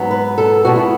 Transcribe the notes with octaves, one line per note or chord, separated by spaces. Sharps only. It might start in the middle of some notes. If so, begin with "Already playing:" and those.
Already playing: G#2 F#3 B3
B4
A4
B2 G#3 B3 F#4
E4